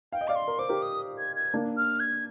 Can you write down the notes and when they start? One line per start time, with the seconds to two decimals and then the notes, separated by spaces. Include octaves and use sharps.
0.12 F5 G5
0.21 D#5
0.28 D5 F5 D6
0.36 C6
0.48 A#4
0.59 C5 D6
0.69 G4 A#4
0.82 D#6
1.19 G#6
1.36 G#6
1.54 A#3 D4
1.77 F6
2.00 G#6